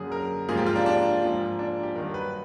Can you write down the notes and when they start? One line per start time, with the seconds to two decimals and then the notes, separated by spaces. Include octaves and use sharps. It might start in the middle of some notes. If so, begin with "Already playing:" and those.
Already playing: F#2 D3 F#3 A#3 G#4
0.12 A#4
0.49 G#2 F3 A#3 G#4
0.57 G4
0.66 F4
0.76 D4
0.86 D4
1.23 G#2 F3 A#3
1.59 D4
1.83 G4
1.95 G2 D#3 F#3 A#4
2.14 B4